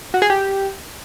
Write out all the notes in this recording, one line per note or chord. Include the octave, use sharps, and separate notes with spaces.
F#4
G#4
G4